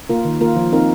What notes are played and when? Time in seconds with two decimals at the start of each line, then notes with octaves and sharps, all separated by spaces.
0.10 A#3 F4 A#4
0.25 D#3
0.41 A#3 F4 A#4
0.56 F3
0.73 C4 D#4 A#4